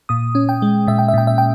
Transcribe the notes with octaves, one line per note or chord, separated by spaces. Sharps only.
A#2 D#6
C#4
G5
G#3
A#2 E5
G5
E5
A#2 G5
E5
G5